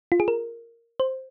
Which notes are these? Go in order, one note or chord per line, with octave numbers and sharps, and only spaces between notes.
F4
G#4
A#4
C5